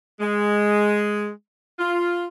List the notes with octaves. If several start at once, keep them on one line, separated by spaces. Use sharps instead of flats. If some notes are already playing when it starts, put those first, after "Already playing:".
G#3
F4